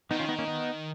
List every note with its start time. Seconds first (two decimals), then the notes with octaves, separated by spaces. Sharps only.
0.10 D#3 B3 D#4
0.19 C#4 F4
0.28 B3 D#4
0.39 A#3 C#4
0.48 B3 D#4